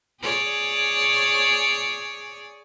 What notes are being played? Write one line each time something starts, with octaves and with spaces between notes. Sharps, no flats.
G#4 C#5 D5